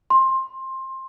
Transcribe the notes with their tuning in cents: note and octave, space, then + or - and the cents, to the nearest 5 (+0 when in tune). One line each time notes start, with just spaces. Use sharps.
C6 +15